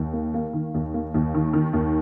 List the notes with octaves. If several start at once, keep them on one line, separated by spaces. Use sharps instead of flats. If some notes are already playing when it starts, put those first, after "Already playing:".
Already playing: D#2
A#3
A#3
D#3
D#2
A#3
D#2
D#3
D#3
D#2